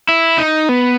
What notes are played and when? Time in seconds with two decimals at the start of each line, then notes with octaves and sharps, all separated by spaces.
0.09 E4
0.38 D#4
0.69 B3